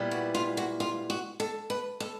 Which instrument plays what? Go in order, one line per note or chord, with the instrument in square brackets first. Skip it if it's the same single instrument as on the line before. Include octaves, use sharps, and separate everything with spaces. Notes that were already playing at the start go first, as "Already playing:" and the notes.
Already playing: [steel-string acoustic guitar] A#2 G3 B3 E4
F#4
F4
F#4
F4
F#4
A4
B4
A4